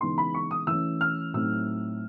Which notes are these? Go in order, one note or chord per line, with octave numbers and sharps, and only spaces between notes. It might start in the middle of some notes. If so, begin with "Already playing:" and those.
C#3 E3 G#3 B3 D#4 C6
B5
C#6
D#6
E3 A3 C#4 E6
F6
A2 F#3 A3 C4 D#4 E6